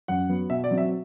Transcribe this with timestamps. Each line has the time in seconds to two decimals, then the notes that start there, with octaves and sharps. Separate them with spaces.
0.08 F#2 F#5
0.29 F#3 B3
0.50 B2 E5
0.64 D5
0.71 F#3 C4
0.78 E5